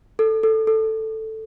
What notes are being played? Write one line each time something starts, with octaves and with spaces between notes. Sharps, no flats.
A4
A4
A4